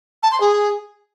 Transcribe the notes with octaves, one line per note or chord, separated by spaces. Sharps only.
A5
C6
G#4